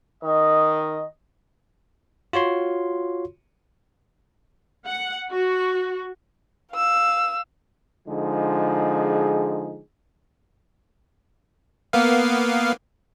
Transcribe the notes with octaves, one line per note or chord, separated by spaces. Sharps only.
D#3 D#5
F4 F#4 C#5 C6
F#5
F#4
F5 E6
D3 F3 G#3 D#4 G#4
A#3 B3 F5